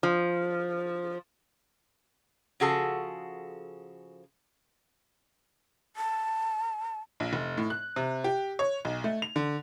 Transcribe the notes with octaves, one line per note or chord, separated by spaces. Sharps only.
F3
C#3 F3 F#4 G#4 A4
A5
A#1
F1
A2
F#6
C3
G4
C#5
B1
A3
F7
D3